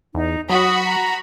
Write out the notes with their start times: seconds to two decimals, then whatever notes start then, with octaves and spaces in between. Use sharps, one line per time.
0.15 E2 D#4
0.50 F#3 F#4 B5 D#6
0.85 A#5